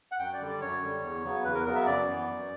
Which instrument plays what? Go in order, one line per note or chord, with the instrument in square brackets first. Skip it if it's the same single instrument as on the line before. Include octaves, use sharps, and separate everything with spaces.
[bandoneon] F#5
F#2 G5
D5
D3 G3
D5
F#2 C#5
D3 G3
E2
C#3 F#3 B3
E2 B4
A#4
C#3 F#3 B3 A#4
E5
F#2 D5
E3 B3
F#2